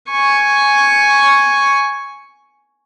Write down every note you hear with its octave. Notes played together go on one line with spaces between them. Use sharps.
G#5 C#6